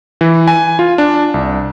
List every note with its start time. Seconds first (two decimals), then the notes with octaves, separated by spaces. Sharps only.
0.21 E3
0.48 G#5
0.79 F4
0.98 D4
1.34 C2